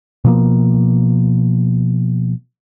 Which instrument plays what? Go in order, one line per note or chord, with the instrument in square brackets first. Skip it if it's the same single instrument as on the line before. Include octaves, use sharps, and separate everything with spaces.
[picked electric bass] B2 F3 A#3